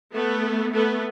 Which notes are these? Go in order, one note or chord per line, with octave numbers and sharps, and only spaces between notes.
A3 B3
A3 B3